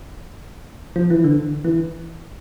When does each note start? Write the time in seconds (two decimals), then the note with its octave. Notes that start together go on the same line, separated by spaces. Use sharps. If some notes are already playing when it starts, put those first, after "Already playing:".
0.96 F3
1.10 E3
1.24 D3
1.64 E3